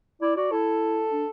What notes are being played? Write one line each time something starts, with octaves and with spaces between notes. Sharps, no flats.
E4 D5
F#4 D5
E4 A4
D4